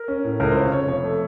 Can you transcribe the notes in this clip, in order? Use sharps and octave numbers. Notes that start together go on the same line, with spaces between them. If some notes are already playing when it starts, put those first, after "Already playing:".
Already playing: A#4
C#4
A2
C#2 A#4
C#3 C5
C#5
F1 C#5
F2 C#5
A3